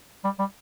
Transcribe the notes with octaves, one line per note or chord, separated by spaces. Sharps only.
G3
G3